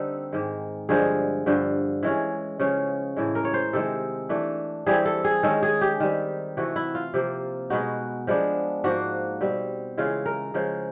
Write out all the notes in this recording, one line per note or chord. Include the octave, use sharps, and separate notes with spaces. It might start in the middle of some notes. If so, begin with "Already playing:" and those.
Already playing: D3 G3 C4 D#4 A4
G#2 D#3 G#3
G2 D3 F3 G#3 G#4
G2 D3 F3
E3 G#3 C#4
C#3 F3 G#3 C#4
A2 E3 G#3
A#4
C#5
C5
C3 D#3 G#3 A4
E3 A3 D4
E3 G3 C4 G#4
A4
G#4
D#3 G#3 C#4 A4
G#4
G4
D#3 G3 C4
C3 E3 A3 F#4
E4
F4
C3 F3 A#3
B2 G#3 B3 D#4 F#4
F3 G#3 B3 D4
G#2 F3 A#3 F#4
B2 G3 C4
C#3 E3 G#3 F4
A#4
C#3 F3 G#3